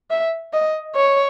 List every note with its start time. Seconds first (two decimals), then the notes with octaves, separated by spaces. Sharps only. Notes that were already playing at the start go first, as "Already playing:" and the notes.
0.10 E5
0.53 D#5
0.96 C#5